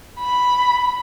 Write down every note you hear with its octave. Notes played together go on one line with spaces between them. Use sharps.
B5